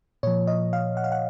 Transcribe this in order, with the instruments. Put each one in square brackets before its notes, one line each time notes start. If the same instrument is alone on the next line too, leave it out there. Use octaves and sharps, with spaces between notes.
[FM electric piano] A#2 F3 C#5
D#5
F5
F#5
F5
F#5